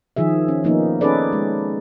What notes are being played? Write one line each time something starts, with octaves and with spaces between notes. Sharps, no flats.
D#3 F3 G#4 E5
C#4
F3 A#3 B3 D#4
C#4 D#4 G#4 A4 B4 D5
G#3